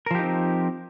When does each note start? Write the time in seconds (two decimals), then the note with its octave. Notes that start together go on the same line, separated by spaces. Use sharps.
0.06 A#4
0.11 F3
0.15 G4
0.19 D#4
0.23 C4